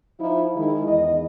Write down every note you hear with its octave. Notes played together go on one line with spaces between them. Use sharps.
F3 D#4 E4
D#3 G#3 E4
E2 D#5